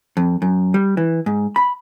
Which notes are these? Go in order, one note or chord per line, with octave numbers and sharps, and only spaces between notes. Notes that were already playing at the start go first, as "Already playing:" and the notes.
F2
F#2
G3
E3
G#2
B5